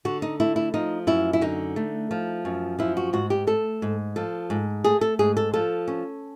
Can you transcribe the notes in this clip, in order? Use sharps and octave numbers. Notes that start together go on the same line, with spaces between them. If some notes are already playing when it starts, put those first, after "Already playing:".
D3 F#4
D#4
A3 E4
E4
F3 D#4
F#2 E4
E4
D3 D#4
A3
F3
F#2
F3 E4
F#4
G#2 F#4
G4
A3 A4
G#2
F3 A4
G#2
A3 G#4
A4
G#2 G#4
A4
F3 A4
C#4